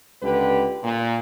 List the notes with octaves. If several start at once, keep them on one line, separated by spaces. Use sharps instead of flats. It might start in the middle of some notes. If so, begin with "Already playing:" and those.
C#2 D3 G4 B4
A#2